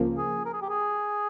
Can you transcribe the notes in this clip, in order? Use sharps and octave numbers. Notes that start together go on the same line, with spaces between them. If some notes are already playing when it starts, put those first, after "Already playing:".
Already playing: C#2 C#3 F3 A#3
G#4
A#4
G#4
G4
G#4